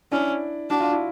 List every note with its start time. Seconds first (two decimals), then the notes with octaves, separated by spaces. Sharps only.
0.12 C#4 D4 E4
0.70 D4 F#4
0.81 F4
0.93 E4